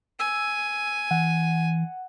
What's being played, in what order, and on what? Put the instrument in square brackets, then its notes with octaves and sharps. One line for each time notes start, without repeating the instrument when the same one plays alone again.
[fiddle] G#5 [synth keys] E6
[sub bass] E3 [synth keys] F#5